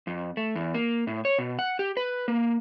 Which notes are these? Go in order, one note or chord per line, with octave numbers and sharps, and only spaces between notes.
F2
A3
E2
A#3
A2
C#5
B2
F#5
G4
B4
A#3